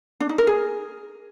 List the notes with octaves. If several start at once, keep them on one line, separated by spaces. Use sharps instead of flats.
D4
D#4
A#4
G#4